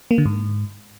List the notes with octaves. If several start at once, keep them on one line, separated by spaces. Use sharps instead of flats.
A#3
D3
G#2